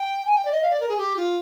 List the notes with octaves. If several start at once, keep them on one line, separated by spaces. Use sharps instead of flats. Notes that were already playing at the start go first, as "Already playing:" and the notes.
Already playing: G5
G#5
G5
D5
D#5
F5
D5
A#4
G#4
G4
F4